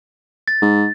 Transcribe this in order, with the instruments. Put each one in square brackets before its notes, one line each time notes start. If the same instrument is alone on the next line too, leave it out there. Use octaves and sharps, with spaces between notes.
[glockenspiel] A6
[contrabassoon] G#2